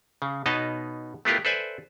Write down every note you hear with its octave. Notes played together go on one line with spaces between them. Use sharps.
C#3
B2 B3 D#4 C#5 D#5 A5
A3 B3 E4 F4 G4 A#4
A4 B4 C5 D5 E5 G#5